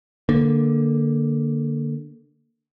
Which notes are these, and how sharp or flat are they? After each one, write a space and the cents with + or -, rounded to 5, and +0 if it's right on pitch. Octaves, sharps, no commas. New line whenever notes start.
D3 +0 A#3 +0